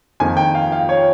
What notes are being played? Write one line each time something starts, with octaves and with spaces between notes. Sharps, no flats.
F2 D#3 A#3 G#5
G5
F5
F5
C#5